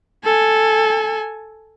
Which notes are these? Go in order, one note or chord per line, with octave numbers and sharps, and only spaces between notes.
A4 G#5